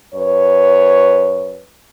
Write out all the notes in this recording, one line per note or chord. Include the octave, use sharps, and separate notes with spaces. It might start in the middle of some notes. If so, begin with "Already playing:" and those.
F#2 B4 C#5